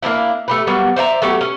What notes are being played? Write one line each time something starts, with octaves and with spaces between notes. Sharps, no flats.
A#3 C4 D4 E4
A3 G4 B4
F#3 G3 A#3 B3
C5 D5 E5 A#5
F#3 A3 B3 G4
C#4